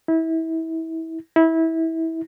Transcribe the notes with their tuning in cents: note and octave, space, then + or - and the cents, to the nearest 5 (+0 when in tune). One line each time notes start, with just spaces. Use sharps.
E4 -25
E4 -20